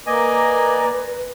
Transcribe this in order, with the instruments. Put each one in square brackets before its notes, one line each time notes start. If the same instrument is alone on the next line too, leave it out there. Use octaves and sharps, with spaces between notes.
[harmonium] A#3 D5 [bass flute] B4 [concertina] D#5 G#5